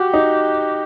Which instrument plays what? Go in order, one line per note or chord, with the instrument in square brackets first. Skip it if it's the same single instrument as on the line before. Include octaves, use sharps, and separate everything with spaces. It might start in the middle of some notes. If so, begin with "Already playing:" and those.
Already playing: [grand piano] F#4 [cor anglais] G4
[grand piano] D#4